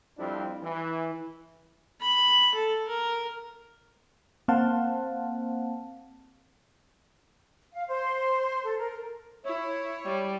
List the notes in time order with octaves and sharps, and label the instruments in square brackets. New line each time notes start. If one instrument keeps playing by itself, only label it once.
[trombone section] F2 F3 G3 C4 D4 E4
E3
[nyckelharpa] B5
A4
A#4
[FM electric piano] A#3 C4 C5 F5 F#5 A5
[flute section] F5
C5
A4
A#4
[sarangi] E4 [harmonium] C#5
[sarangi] G3